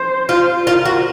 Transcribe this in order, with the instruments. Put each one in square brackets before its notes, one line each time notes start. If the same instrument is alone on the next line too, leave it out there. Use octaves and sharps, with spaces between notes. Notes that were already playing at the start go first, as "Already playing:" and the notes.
Already playing: [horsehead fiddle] C5
[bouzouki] F4
[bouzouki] F4 [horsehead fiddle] A#4
[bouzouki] F#4